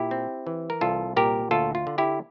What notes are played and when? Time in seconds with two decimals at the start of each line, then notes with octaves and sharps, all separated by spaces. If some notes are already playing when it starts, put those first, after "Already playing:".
Already playing: A#2 E4 G4
0.11 C4
0.47 E3
0.70 A#4
0.81 C2 F4 A4
1.16 A#2 G4 A#4
1.51 D2 F4 A4
1.75 F4
1.87 D3
1.98 E4 G4